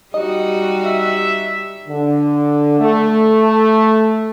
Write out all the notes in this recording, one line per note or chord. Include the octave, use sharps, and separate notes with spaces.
G3 D#4 F#4 G4 D#5
E5
D3
A3